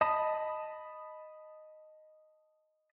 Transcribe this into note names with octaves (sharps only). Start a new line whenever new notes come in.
D#5 A5 B5 D#6